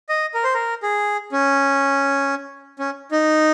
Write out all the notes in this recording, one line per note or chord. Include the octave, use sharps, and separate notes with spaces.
D#5
A#4
C5
A#4
G#4
C#4
C#4
D#4